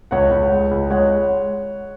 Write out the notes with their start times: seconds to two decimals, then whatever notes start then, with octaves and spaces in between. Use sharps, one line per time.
0.11 C#2 C#5 F#5
0.31 C#2
0.52 G#3
0.71 C#2
0.90 G#3 C#5 F#5